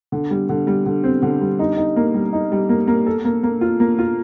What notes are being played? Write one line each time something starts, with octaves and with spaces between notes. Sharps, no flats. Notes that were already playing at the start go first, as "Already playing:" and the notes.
D3
G3
D3
G3
D3
C4
D3
G3
D#4
D#4
A#3
G3
D#4
G3
A#3
A#3
A4
A#3
A#3
F4
A#3
F4